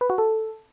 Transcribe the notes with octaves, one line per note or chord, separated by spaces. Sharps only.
B4
F#4
A4